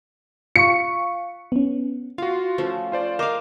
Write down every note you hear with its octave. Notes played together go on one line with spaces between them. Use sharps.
F4 F5 C#6 C#7
B3 C#4
F4 F#4 F5
F3 A3 C#4
F4 C5 D5
A#4 C5 D#5 F5 D6